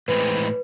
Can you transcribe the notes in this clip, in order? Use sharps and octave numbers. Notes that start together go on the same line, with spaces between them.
A2 E3 G#3 C4 B4